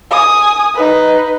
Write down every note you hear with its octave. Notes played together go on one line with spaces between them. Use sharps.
G#5 D#6
D#4 B4